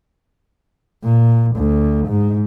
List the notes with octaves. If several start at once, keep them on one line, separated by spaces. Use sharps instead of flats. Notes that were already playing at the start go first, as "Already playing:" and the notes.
A#2
D2
G#2